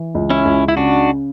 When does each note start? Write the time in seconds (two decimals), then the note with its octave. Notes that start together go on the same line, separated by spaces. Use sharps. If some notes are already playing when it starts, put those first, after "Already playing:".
Already playing: E3
0.15 C#2
0.30 C#4 E4
0.45 C#2
0.68 E4
0.77 C#3 D4 F#4